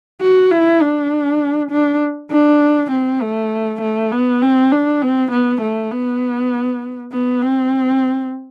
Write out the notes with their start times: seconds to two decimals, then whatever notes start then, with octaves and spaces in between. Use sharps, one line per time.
0.21 F#4
0.51 E4
0.81 D4
1.71 D4
2.31 D4
2.91 C4
3.22 A3
3.81 A3
4.12 B3
4.42 C4
4.72 D4
5.02 C4
5.32 B3
5.62 A3
5.91 B3
7.12 B3
7.42 C4